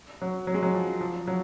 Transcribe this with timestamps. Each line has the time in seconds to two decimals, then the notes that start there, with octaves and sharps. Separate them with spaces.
0.22 F#3
0.47 F#3
0.54 G#3
0.63 F#3
0.74 F3
1.01 F3
1.28 F#3